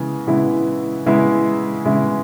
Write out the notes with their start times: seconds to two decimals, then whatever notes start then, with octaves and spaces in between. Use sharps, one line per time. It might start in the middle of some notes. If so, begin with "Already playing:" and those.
Already playing: C#3 E3 G#3 B3
0.27 C#3 E3 G#3 B3 E4
1.06 C#3 E3 G#3 B3 E4
1.85 C#3 E3 G#3 B3 E4